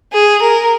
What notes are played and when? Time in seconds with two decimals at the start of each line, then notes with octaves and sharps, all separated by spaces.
0.12 G#4
0.42 A#4